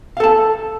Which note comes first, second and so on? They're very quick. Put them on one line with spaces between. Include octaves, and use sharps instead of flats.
F5 A4 A5